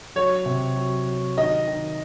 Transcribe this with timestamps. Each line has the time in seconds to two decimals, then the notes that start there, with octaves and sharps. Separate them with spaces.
0.15 F#3 C#5
0.46 C3
0.76 F#3
1.07 F#3
1.37 D#3 D#5
1.67 D#3